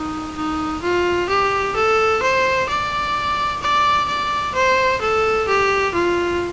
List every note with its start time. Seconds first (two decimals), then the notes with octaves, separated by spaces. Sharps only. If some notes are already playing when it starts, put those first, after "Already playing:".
Already playing: D#4
0.37 D#4
0.83 F4
1.29 G4
1.76 A4
2.22 C5
2.69 D5
3.62 D5
4.08 D5
4.56 C5
5.02 A4
5.48 G4
5.95 F4